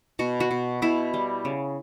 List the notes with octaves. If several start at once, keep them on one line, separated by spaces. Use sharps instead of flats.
B2 F#4
F#4
B2
B2 E4
G3
C#3